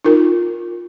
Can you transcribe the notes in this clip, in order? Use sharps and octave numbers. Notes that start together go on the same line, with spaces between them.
D#4 F4 A#4